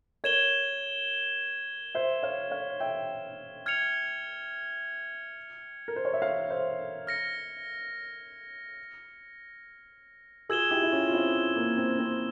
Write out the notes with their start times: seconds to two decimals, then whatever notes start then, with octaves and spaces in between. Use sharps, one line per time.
0.24 A#4 C#5 G#6 E7 G7
1.95 C5 E5
2.23 C#5 F5
2.51 C#5 F5
2.80 E5 G5
3.66 F6 G#6 C#7 F7
5.88 A#4
5.96 C5
6.05 C#5
6.14 E5
6.22 C#5 F5
6.50 C5 E5
7.07 F6 A#6 C#7
10.49 F4 G#4 E6 G#6 E7 G7
10.71 E4 G4
10.83 E4
10.92 C#4 F4
11.07 F4
11.13 C4 E4
11.56 A#3
11.78 C4
11.99 C4